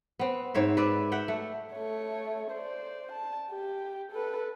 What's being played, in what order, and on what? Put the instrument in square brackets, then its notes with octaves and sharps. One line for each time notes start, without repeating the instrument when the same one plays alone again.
[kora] B3 C4
G#2 C4 C#5 E5
B4 D5 E5
E5 F#5 G5
A3
[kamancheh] A3 C#5
C5 D5
A5
G4
A4 B4